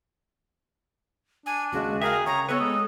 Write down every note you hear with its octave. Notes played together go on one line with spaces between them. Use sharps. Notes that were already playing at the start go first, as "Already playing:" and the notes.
D4 G#5
D#2 C#3 G#3 F#4
G#4 A#4 E5 F5 G5
C#3 C#5 A#5
B3 F#4 A4 B4 C#5 C#6
G#3 D#6